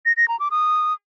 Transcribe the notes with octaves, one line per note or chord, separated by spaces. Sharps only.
A#6
A#6
A#5
D6
D#6